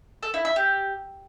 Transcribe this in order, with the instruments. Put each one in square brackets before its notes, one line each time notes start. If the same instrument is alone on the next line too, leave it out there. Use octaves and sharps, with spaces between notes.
[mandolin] A4
E4
E5
G4